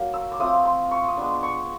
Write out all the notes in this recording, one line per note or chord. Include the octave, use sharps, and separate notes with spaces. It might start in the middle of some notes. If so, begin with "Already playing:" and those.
Already playing: F#3 A#3
E6
D6
A3 C4 F4 D#6
C6
C#6
D#6
G#3 B3 D4 D6
C#6